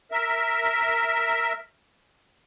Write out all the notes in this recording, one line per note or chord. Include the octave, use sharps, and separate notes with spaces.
A#4 E5